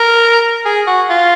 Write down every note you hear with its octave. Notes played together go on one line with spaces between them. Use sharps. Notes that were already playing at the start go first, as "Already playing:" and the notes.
Already playing: A#4
G#4
F#4
F4